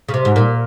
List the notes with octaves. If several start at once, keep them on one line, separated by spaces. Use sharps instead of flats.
C#3
C3
G#2
A#2